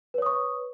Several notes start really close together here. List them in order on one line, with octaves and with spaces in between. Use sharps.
B4 C#5 D#6 C#6